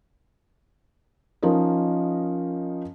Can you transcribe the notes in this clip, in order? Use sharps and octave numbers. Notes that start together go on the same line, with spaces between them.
F3 C#4 D#4 A#4 D#5